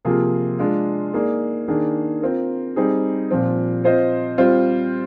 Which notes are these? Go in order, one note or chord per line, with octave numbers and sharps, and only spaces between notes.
C3 F3 A#3 F4 G#4
G#3 D4 F4
A#3 D#4 G#4 D5
D#3 A#3 D4 G#4
C4 F4 A#4
G3 C4 D#4 G#4
A#2 F3 C4
C4 F4 C5 D#5
G3 C4 F4 C5